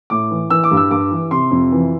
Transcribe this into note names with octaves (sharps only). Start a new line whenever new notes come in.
A2 D6
E3
E3 E6
D6
G2
E6
G2 D6
E3
C3 C6
F2
E3